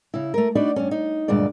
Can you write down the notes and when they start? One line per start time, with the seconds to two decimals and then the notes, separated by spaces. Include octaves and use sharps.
0.14 C#3 E4
0.34 A3 A#4
0.55 D4 D#4 F#4 B4 D5
0.76 G2 C#4
0.91 D#4
1.28 D2 G2 A#2 G#3 D5